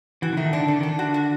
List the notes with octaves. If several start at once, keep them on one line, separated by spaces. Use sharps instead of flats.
E3 F#4
D3
D#3 A3
D3 D4
D3 D4
D#3 D4
D3
F#4
F#4